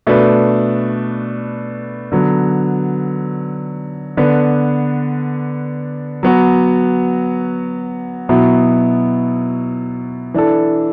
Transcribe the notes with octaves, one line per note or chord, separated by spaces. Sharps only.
B2 A3 D4 B4
D3 F#3 B3
D3 B3 D4 B4
F#3 B3 F#4
B2 F#3 B3 E4
E3 D4 A4